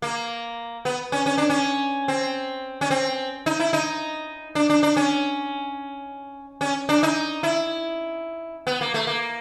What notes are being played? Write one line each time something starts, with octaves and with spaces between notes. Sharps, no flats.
A#3
B3
C#4
C#4
D4
C#4
C4
C#4
C4
D#4
E4
D#4
D4
D4
D4
C#4
C#4
D4
D#4
E4
B3
A#3
A3
A#3